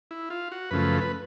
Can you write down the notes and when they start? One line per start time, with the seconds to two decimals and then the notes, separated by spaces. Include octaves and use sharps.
0.11 E4
0.30 F4
0.52 F#4
0.71 F#2 C#3 F3 A3 B4
1.01 B4